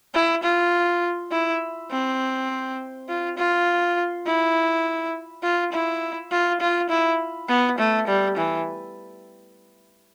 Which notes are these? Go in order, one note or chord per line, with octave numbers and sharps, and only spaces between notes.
E4
F4
E4
C4
F4
F4
E4
F4
E4
F4
F4
E4
B3
A3
G3
E3